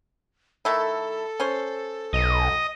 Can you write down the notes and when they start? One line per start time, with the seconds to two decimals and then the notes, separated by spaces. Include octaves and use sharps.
0.65 D#3 A3 E4 A4
1.40 C#4 C5
2.13 B1 D#5